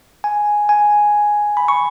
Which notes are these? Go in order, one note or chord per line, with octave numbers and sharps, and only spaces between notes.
G#5
G#5
B5
C#6